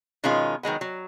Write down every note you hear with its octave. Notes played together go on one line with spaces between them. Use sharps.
B2 D#3 F3 G#3 C#4 F4
D#3 F#3 G#3 B3
F#3